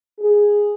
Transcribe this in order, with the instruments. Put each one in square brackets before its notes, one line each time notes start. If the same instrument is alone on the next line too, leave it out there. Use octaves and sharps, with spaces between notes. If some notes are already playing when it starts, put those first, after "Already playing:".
[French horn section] G#4